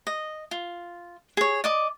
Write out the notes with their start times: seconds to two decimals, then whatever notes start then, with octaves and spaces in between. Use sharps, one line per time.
0.07 D#5
0.51 F4
1.37 G#4 C#5
1.64 D5 D#5 D6